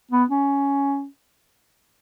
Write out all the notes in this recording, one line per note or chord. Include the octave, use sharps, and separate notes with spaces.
B3
C#4